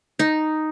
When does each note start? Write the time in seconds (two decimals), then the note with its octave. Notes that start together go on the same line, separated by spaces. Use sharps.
0.19 D#4